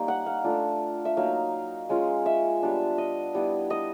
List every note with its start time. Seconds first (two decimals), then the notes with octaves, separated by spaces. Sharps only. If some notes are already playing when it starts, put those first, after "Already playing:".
Already playing: G3 A#3 C#4 D#4
0.08 F#5
0.26 F5
0.44 A3 D4 F4
1.05 E5
1.17 F#3 A#3 D#4 F5
1.89 G#3 C#4 F4
2.26 E5
2.63 G3 B3 D4
2.98 D#5
3.35 G3 B3 E4
3.70 D#5